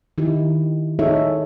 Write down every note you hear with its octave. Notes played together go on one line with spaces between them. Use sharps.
D#3 D#4 E4 G4
D#4 G#4 A4 C#5 E5